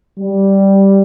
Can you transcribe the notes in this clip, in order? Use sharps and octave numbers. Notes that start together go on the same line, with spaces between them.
G3